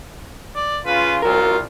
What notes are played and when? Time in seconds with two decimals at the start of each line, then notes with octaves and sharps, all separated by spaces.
0.55 D5
0.86 C#3 F4 B4
1.22 C2 F4 F#4 A#4